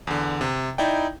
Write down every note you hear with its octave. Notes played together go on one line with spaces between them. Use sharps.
E2 D3
C3
D#4 E4 D5 G5